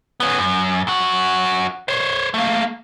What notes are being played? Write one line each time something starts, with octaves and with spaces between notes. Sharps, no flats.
B3 C#4
F#2
F#2 F#4
C5 C#5
A3 A#3